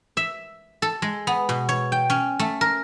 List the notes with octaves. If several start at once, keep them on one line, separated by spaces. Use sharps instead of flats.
E5
A4
G#3
B3
B2
C#5
G5
C#4
A3
A#4